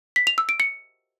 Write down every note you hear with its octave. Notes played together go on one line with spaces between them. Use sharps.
B6
F7
E6
D7
C#7